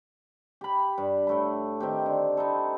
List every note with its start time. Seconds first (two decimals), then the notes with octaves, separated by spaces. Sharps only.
0.61 G4 B5
0.98 G2
1.27 A2 A3 B5
1.80 D#3 C4 G4
2.06 D3
2.37 D#4 E4 A4